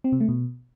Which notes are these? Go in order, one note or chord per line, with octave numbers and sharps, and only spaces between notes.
C4
C3
A3
B2